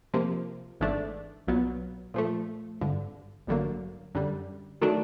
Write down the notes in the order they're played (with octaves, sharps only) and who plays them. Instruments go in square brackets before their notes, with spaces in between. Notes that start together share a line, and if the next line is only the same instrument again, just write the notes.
[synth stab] C3 F3 A#3
G#1 G#2 E3 A3 D4
B1 A#2 F#3 B3
A#2 F3 A3
G#1 G2 D3
A1 G2 D3 F#3 A#3
F#2 D3 G3
D#3 F#3 A3 D4